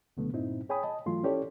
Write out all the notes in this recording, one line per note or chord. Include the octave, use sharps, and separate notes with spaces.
C#2 B2 D3 F#3 A3 B3
G2 A#2 C4 D#4 E4
G#4 C#5 G5 G#5 B5 D#6
D#5 A5
G#2 E3 F#3 A3 F4 C6
C#4 E4 G4 A4 C#5 D5